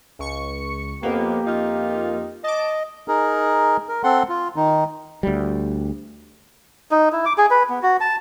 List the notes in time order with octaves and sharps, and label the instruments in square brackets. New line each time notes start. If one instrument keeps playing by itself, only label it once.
[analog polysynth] C#2 C#6 C#7
[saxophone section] F2 B3 [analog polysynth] A#3 [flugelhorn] G4
[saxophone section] F2 D#4 F4
[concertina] D#5 [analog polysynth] A5 D6
[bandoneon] D#4 G#4 A#4
A#4
C4 A4 F#5 C6
F4
D#3 D#4
[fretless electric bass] D2 G3
[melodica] D#4
E4
D6
G#4
B4
B3
F#4
A5